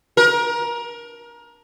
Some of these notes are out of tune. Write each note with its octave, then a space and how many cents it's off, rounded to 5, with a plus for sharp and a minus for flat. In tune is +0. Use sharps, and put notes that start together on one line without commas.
A#4 +25